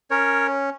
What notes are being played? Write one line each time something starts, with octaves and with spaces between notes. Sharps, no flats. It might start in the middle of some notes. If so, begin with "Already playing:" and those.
C#4 A#4 C#5